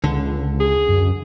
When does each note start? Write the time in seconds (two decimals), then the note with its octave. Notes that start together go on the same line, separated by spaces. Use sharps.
0.04 C#2 D3
0.60 G#4
0.89 F#2